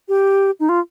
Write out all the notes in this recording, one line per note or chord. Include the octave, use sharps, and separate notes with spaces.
G4
D#4
F4